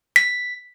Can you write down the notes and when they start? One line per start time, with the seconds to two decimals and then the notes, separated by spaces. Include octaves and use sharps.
0.16 B6